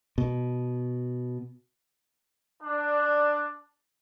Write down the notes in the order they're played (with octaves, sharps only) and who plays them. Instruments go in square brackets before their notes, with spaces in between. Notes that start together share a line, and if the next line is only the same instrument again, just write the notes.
[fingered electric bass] B2
[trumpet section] D4